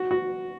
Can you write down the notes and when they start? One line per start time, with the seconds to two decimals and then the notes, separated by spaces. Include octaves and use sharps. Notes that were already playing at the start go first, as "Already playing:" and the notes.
Already playing: F#4
0.11 F#4